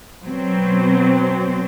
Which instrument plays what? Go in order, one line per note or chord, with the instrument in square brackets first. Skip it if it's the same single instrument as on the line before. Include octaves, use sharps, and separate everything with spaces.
[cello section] B2 F#3 C4